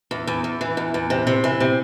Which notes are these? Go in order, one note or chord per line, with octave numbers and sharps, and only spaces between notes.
E2
E2
E2
E3
E2
E2
C3
C3
E3
C3